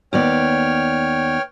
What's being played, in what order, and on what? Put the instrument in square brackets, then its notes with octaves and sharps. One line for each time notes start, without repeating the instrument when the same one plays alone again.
[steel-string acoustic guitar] D#2 B3 D5 [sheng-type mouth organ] C#5 G5 F6